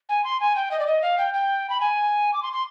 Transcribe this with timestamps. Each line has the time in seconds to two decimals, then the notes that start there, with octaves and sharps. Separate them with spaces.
0.09 G#5
0.24 C6
0.40 G#5
0.56 G5
0.71 D#5
0.80 D5
0.87 D#5
1.02 F5
1.18 G5
1.34 G5
1.70 B5
1.81 G#5
2.33 D6
2.43 C6
2.53 C6